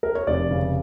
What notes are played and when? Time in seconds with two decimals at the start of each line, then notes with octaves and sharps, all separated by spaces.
0.03 A#4
0.15 C#5
0.27 F1 D5
0.51 C#3